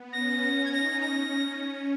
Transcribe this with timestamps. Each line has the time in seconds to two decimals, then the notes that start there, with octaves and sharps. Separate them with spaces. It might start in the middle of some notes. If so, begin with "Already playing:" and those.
Already playing: B3
0.12 C#4 A#6
0.65 G#6
0.71 D#4 A#6
1.01 C#4 A#6